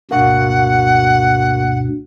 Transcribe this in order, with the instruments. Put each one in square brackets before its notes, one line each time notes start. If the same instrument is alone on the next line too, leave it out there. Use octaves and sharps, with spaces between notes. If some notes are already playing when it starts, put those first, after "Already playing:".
[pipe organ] D2 G2 B2 [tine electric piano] A#3 F#4 [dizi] F#5